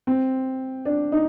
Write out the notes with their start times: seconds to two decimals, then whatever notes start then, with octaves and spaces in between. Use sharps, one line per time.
0.07 C4
0.85 D4
1.12 D#4